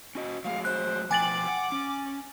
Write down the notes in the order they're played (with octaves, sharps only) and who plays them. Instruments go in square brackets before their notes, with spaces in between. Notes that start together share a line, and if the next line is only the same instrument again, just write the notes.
[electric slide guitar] C#4 F#4 D#5
[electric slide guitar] F#3 A3 G#4 [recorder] F5
[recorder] C5 [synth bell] F#6
[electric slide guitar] B2 F3 G5 [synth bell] G#5 A6 F#7 [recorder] D6
[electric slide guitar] F#5
C#4